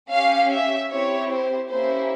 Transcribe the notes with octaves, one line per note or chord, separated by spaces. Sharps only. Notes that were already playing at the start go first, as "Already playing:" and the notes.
C#4 G4 F5
E5
C4 E4 G4 C#5
C5
A#3 C#4 E4 G4 C5